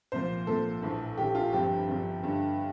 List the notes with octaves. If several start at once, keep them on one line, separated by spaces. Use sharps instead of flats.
C2 A#2 F3 A#3 C5
C2 A#2 F3 A#3 A4
A#1 A2 E3
A#1 A2 E3 G4
F4
G1 G2 F3 C4 G4
G1 G2 F3 C4
G1 G2 D3